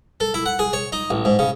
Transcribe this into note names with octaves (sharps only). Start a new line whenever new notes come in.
A4
E4
F#5
G#4
C#5
D#4
A1
G#2
C#3